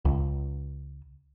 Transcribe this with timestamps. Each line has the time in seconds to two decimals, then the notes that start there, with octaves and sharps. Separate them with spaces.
0.05 C#2